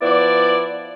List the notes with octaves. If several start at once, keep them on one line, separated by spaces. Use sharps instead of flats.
F3 B3 E4 D5